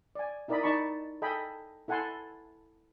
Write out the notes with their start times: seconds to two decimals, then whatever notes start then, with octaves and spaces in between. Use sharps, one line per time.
0.15 D5 G#5
0.48 D#4 E4 A#4 D5 D#5 B5
0.63 D#4 D5 A5 B5 C#6
1.22 A4 D#5 G5 G#5 B5
1.88 E4 A4 F#5 G#5 A5 C6